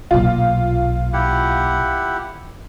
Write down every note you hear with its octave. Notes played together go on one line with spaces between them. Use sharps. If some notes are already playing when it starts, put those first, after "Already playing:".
B1 A#2 F4
E4 G4 F#5